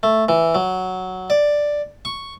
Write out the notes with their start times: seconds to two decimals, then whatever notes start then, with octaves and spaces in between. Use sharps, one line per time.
0.03 A3
0.29 E3
0.55 F#3
1.30 D5
2.05 C#6